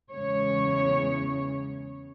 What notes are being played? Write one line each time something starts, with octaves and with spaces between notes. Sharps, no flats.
E2 C#3 G#3 C#5